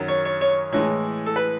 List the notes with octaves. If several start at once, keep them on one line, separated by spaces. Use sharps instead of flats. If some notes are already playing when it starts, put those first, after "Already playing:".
Already playing: F#2 D#3 F#3
C#5
C#5
C#5
A2 E3 G#3 C#5
A4
B4